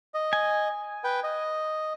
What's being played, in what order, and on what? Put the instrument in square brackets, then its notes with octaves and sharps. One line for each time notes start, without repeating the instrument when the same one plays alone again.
[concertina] D#5
[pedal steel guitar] G#5
[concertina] B4 G5
D#5